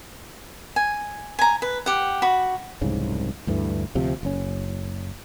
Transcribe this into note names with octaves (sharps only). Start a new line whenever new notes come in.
G#5
G#5 A#5
B4
G4 F#5
F#4 B5
F1 C2 G#2 C#3
D2 G2 D3 E3
D2 C3 F3
F#1 C#4